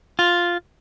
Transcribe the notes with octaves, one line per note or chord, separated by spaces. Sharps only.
F4